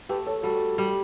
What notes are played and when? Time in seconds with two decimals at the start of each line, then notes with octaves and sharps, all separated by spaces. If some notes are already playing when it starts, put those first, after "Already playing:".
0.09 A3 G4 B4
0.27 A4 C#5
0.43 G3 F#4 A4
0.78 G3